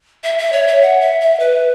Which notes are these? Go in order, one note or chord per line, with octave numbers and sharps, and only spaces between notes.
E5
E5
C#5
E5
F#5
E5
E5
B4